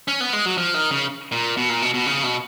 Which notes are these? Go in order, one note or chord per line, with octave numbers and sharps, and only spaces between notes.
C#4
B3
G#3
F#3
F3
D#3
C#3
A#2
B2
A#2
B2
B2
C#3
B2